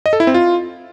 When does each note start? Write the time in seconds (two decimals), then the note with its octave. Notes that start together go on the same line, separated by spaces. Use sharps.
0.06 D#5
0.13 A4
0.20 E4
0.27 C4
0.34 F4